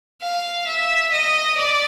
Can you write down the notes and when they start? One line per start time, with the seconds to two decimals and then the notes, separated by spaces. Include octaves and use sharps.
0.21 F5
0.66 E5
1.12 D#5
1.57 D5